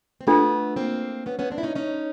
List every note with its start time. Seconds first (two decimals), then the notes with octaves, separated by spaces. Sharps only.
0.21 C4
0.27 A3 B3 D4 F4 A4
0.76 A#3 C4
1.26 B3 C#4
1.39 B3 C#4
1.51 C4 D4
1.58 E4
1.63 C#4 D#4
1.75 C#4 D#4